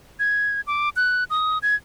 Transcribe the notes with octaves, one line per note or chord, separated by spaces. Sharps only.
G#6
D6
F#6
D#6
G#6